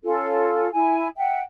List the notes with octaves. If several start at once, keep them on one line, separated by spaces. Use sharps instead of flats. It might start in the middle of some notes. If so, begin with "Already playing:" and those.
C#4 F4 A4
E4 G#5
E5 F#5 G5